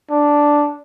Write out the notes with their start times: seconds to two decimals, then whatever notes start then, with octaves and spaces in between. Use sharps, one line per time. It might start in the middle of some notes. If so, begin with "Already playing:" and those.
0.11 D4